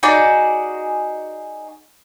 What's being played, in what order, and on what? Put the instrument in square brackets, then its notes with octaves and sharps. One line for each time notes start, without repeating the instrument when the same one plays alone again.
[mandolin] D#4 F#4 G#4 D5